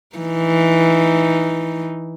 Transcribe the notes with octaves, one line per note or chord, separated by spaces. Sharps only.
E3 D#4